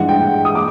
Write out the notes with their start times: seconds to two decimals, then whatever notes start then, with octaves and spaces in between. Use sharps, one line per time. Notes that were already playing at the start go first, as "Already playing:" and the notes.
Already playing: G2 E3 G#3 F#5
0.09 G5
0.45 D#6
0.55 D6